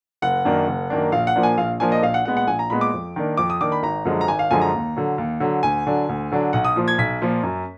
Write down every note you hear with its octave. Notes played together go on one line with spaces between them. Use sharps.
F#1 F#5
F#2 D#3 A#3 D4
F#1
F#2 D#3 A#3 D4
A#1 F5
F#5
A#2 F3 A#3 D4
G#5
A#1 F5
A#2 F3 A#3 D4 G#5
D#5
A#1 F5
F#5
A#2 G#3 B3 F#5
F#5
A#1 G#5
A#5
A#2 G#3 B3 B5
D6
F2
D#3 A#3 D4
F2 D6
D#6
D#3 A#3 D4 D6
B5
G#1 A#5
F#2 D3 F3 G#3
A#5
G#1 G#5
F5
F#2 D3 F3 G#3 G#5
A#5
D#2
D3 F#3
D#2
D3 F#3
D2 G#5
D3 F#3 D4
D2
D3 F#3 D4
B1 F#5
D#6
A#2 F3
G#6
B1 B6
A#2 F3
F#2